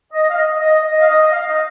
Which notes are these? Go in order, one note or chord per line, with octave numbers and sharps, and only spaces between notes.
D#5
F5
D#5
D#5
D#5
F5
D#5
F5
D#5